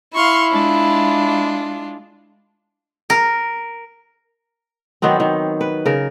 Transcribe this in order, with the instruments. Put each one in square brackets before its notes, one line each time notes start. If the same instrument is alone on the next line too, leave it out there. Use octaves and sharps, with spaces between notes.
[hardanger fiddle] E4 [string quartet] F5 C6 C#6
[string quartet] G#3 D4 F4
[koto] A#4
[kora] D#3 F#3 B3 C4
D#3
B4
C#3 A#4